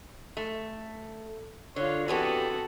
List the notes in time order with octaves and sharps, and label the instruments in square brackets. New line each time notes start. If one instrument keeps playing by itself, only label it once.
[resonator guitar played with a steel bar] A3
[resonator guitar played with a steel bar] D3 [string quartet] F4 C#5
[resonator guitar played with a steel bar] E3 B3 G4 [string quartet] C4 F#4 A4